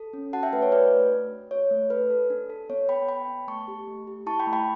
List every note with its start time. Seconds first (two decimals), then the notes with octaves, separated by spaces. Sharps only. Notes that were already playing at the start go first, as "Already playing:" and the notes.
Already playing: A4
0.13 C#4
0.33 F#4 F#5 A5
0.43 E5 G5
0.53 A3 B4
0.62 C#5
0.72 F#4 B4 D5
0.92 A3
1.12 D4
1.32 D4
1.51 F#4 C#5
1.71 A3
1.90 A4 B4
2.10 A4
2.30 D4
2.50 A4
2.70 B3 C#5
2.89 B3 G5 B5
3.08 B3 G5 B5
3.28 B3
3.48 A3 A5 C#6
3.68 G4
3.87 A3
4.07 G4
4.26 E4 A5 C#6
4.39 G5 B5
4.47 A3
4.53 G5 B5